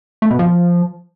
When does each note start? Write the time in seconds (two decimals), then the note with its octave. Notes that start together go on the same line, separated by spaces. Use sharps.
0.22 A3
0.31 B2
0.39 F3